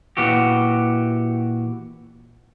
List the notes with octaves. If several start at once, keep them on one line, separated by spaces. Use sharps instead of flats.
A#2 E3 F#4 G4